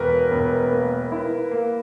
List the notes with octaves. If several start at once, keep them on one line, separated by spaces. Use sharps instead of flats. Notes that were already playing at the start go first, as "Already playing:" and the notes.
Already playing: E1 A#4 B4
E1
A#3
E4
A#3